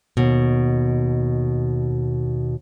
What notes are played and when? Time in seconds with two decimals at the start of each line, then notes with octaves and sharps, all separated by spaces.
0.17 D#2 B2